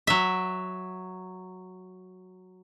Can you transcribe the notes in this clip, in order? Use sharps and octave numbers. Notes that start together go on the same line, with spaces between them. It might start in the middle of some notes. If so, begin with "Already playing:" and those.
F#3 E5